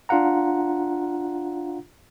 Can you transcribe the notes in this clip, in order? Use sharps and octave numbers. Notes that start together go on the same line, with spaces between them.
D4 F4 F5 F#5 A#5